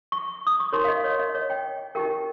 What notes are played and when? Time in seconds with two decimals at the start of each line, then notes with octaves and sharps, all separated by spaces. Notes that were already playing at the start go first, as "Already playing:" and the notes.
0.12 C#6
0.47 D#6
0.60 C#6
0.72 D#4 G4 A#4 C#5 C6
0.84 F5
0.88 D#5
1.04 C#5
1.19 D#5
1.35 C#5
1.50 G5
1.95 D#4 G4 A#4 G5